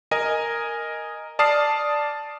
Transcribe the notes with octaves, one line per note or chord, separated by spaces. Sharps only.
A#4 D#5 G#5
D5 A5 D#6 F6 C7